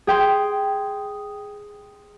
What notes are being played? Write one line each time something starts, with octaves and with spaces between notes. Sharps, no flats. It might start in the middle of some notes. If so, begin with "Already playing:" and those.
G#4 G5 C6